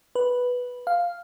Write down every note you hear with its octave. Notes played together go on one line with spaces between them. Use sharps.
B4
F5